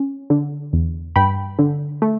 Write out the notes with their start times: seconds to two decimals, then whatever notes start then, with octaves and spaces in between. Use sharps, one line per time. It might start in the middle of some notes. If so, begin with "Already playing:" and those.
Already playing: C#4
0.30 D3
0.73 E2
1.16 G2 G5 B5
1.59 D3
2.02 A3